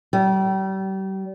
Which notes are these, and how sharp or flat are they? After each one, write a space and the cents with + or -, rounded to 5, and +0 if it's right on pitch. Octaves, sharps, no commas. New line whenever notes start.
G3 -35